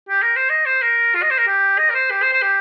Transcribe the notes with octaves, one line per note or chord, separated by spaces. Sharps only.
G4
A#4
C5
D#5
C5
A#4
F4
D#5
C5
A#4
G4
D#5
A#4
C5
G4
C5
C5
G4